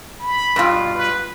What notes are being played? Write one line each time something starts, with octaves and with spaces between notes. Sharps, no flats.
B5
G2 B2 F4
B4